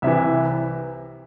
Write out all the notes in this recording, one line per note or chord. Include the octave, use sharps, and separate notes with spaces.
C2 C3 E3 E5